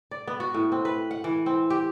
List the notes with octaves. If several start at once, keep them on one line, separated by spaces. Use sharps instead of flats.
D5
B3
F#4
A2
C4
B4
F#5
E3
C4
G4